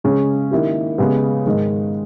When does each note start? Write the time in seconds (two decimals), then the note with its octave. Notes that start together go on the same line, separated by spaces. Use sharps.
0.04 C#3 G#3 C#4 G#4
0.51 D#3 A#3 E4 G4
0.98 C#3 G#3 B3 G4
1.46 G#2 D#3 G#3